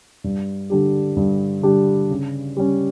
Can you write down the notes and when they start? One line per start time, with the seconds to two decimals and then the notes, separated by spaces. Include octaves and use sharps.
0.24 G2
0.70 D3 G3 D4 G4
1.17 G2
1.63 D3 G3 D4 G4
2.10 C#3
2.57 G3 C#4